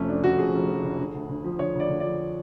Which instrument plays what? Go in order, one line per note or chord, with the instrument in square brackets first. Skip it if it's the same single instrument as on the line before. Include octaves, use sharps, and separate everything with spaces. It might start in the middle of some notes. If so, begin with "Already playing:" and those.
Already playing: [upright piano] F1 F2 A3 C#4
F3 D4
D3 F#4
F2 G#4
F1
F3
D3
D3
D2
D2
F3
D3 C#5
D2 D5
D2
F3 D5